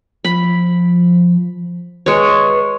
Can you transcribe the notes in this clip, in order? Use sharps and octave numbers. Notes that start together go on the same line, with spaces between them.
F3 B5
G#3 B4 C#5